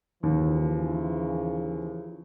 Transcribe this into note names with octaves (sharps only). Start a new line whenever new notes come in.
D#2 C#3 E3 F3